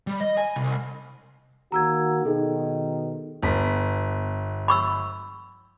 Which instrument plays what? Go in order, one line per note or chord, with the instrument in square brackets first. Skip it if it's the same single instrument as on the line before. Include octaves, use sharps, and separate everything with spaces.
[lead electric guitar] G3
D#5
G#5
C2
[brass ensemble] D#3 A#3 F#4 [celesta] A#5 E6 G#6
[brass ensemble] B2 D#3 [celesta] D#4 G#4 A4
[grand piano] G1 B3 B6
[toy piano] B5 C#6 E6